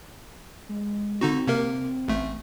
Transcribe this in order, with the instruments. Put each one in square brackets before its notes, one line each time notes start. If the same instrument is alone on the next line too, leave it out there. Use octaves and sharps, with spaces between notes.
[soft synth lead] G#3
[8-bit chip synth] D3 D#4 F#4 [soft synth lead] C4
[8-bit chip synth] C3 A#3 A#4
A1 A3